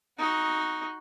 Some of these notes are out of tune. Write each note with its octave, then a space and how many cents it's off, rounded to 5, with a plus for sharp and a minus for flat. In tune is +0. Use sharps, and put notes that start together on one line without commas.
D#4 +10 F#4 +0